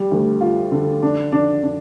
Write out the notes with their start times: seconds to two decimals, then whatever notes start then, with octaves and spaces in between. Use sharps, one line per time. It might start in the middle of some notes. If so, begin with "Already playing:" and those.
Already playing: G3
0.11 D2
0.41 F4
0.72 D3
1.02 D4
1.32 D4
1.63 D4